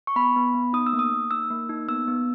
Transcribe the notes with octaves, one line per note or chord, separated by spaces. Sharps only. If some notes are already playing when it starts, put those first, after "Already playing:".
C#6
B3 B5
B3
B3
D#4 D#6
E6
A#3
D#6
A#3
D#4 E6
A#3
D#4
B3 E6
B3